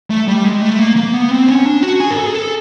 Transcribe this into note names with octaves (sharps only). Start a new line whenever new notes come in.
A3
G3
G#3
A3
A#3
A#3
B3
C4
C#4
D4
F#4
G#4
A#4
A4
G#4
A4